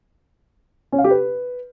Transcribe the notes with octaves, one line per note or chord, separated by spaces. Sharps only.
C#4
F5
G4
B4